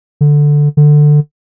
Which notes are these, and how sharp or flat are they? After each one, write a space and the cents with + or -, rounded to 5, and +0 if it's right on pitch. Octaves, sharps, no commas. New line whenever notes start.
D3 +0
D3 +15